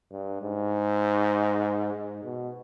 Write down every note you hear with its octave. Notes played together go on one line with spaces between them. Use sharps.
G2
G#2
G#2
B2